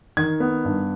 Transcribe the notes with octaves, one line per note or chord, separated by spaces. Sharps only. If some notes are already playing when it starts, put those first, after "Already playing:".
D#3 G#6
B3
G2